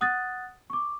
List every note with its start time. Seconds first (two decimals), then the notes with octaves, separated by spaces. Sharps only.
0.01 F#5 D#6 F#6 A6
0.70 C#6 D6